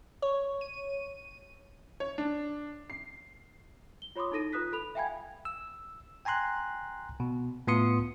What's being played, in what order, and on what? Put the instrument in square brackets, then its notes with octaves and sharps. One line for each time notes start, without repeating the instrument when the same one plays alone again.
[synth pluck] C#5
D#7
[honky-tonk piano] C#5
D4
C7
[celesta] G7
F4 C#5 B5 C6 D6 D#6
D#4 E4 A4 A#6 D#7
F4 B4 D#6 F#6 B6
A4 B5 F7
E5 F5 G5 G#5 B5 G#6
[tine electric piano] E6
G5 G#5 A#5 C6 F#6
B2
A2 B3 F4 C6 D#6 C#7